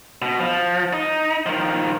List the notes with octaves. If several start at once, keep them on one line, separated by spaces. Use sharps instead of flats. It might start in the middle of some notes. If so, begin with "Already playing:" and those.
B2
F3
D#4
D#3 F3